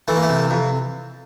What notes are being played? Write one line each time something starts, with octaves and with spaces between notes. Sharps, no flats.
E3 A3
A#3
A3
C3
F2